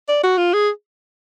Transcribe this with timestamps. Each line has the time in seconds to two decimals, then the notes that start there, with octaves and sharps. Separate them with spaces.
0.09 D5
0.23 F#4
0.38 F4
0.54 G#4